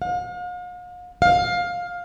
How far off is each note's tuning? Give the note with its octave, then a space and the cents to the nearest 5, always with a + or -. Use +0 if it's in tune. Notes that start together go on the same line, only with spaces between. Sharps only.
F5 +45
F5 +15